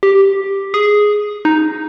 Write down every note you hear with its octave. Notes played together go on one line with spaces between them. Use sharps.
G4
G#4
D#4